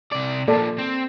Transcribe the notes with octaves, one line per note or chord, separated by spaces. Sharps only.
C3 D5
A#2 F3 A#3 A4 D5
C4